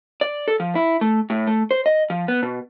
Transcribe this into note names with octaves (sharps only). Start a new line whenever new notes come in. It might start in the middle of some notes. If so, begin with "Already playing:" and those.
D5
A4
F3
E4
A3
A2
A3
C5
D#5
F3
B3
B2